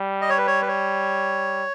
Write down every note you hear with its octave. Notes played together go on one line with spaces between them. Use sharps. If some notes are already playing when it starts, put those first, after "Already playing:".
Already playing: G3
D#5
C#5
B4
C#5
B4
C#5